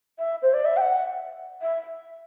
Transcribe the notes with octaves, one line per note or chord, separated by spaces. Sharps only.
E5
C5
D5
E5
G5
F#5
E5